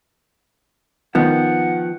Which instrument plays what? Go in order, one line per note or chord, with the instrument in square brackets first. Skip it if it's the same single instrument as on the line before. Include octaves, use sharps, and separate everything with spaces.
[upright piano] D#3 [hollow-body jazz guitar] F3 B3 [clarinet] F#5